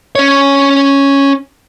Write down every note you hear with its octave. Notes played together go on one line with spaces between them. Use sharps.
C#4 C#5